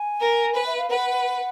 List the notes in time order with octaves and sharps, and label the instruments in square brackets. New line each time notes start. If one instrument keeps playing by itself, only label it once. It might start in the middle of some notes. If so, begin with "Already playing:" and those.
Already playing: [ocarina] G#5
[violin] A#4
B4
[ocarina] E5
F5
[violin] B4 [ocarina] F#5